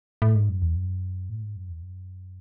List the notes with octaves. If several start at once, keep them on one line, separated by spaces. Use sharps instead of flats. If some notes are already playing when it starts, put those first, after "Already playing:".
A2
G#2
F#2
E2
F#2
A2
G#2
F#2
E2
F#2